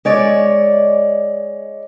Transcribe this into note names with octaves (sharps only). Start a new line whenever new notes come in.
G#3 C#5 D5